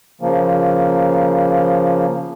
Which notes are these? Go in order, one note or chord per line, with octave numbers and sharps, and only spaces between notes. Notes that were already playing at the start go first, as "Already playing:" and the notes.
C#3 F3 A#3